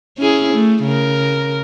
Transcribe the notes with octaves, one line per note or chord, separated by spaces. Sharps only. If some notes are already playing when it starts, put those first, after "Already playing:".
C#4 E4 G#4
A3
C#3 A#4